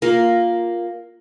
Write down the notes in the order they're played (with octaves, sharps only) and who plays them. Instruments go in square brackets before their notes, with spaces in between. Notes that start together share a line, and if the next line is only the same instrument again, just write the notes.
[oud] A#3 F4